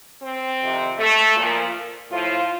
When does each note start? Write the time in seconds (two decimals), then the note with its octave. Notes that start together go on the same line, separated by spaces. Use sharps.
0.23 C4
0.61 F2 C3 D#3
0.99 A3
1.36 A#2 F3
2.11 A2 F3 F4